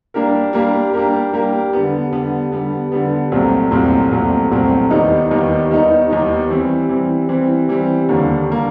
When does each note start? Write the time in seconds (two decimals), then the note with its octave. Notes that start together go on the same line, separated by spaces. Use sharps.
0.14 G3 A#3 D4 G4 A#4
0.53 G3 A#3 D4 G4 A#4
0.93 G3 A#3 D4 G4 A#4
1.33 G3 A#3 D4 G4 A#4
1.73 D3 G3 B3
2.12 D3 G3 B3
2.52 D3 G3 B3
2.92 D3 G3 B3
3.32 C2 A#2 F#3 A3 C4
3.71 C2 A#2 F#3 A3 C4
4.11 C2 A#2 F#3 A3 C4
4.51 C2 A#2 F#3 A3 C4
4.90 D#2 D#3 G3 B3 D#4
5.30 D#2 D#3 G3 B3 D#4
5.70 D#2 D#3 G3 B3 D#4
6.10 D#2 D#3 G3 B3 D#4
6.50 E3 G3 C4
6.89 E3 G3 C4
7.29 E3 G3 C4
7.69 E3 G3 C4
8.09 D#2 D3 G3 A#3
8.49 D3 G3 A#3